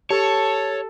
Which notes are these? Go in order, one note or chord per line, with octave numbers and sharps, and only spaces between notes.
G4 A4 C#5 A5